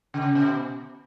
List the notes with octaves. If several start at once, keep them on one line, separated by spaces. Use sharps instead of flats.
C#3
B2